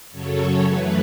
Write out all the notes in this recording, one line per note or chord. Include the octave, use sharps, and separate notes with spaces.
F#2 C#3 F#3 A4 C#5
F#2 E3 A3 B4